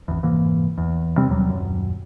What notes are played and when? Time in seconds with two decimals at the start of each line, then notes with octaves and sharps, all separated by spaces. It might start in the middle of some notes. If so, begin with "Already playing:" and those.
0.08 G#1 E2
0.23 F1 G#2 E3 A#3
0.78 E2
1.18 C3 G3 C4
1.29 D#2 B2 F#3 G3
1.49 D#1 G#1 F#2